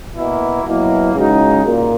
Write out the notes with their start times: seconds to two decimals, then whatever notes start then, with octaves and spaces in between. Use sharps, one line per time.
0.13 B2 A#3 E4
0.63 B2 F#3 A#3 E4
1.14 C#3 G#3 D#4 F#4
1.65 A#2 A#3